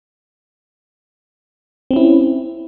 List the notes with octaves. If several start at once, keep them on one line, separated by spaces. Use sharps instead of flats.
C4 C#4 E4